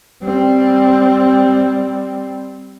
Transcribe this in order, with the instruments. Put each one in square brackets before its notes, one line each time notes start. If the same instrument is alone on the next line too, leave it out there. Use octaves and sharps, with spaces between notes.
[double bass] G3 C4